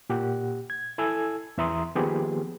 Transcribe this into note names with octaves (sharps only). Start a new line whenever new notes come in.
A#2 G4 F#5
G#6
E4 A4 G#5 E6 G#6
E2 E3 E5 A#5 C6 D#6
D#3 F3 A#3 B3 G4 G#4